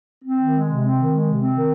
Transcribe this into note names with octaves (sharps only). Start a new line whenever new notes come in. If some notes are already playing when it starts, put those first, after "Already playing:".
C4
D#3
G#3
C3
C4
D#3
G#3
C3
C4
D#3